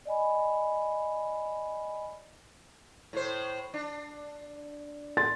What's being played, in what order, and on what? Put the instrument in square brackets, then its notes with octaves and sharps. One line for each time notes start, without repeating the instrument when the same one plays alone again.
[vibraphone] D5 D#5 G#5 B5
[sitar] A2 C5
D4
[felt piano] C6 A6